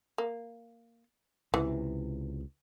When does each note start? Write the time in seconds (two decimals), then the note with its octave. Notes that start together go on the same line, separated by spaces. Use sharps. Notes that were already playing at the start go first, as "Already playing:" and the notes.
0.18 A#3
1.54 C#2 C3 E3